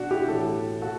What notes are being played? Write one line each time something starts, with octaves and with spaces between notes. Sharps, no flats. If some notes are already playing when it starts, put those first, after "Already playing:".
Already playing: B2 D4 F#4
E4 G4
A2 E3 F#4 A4
B2 F#4 A4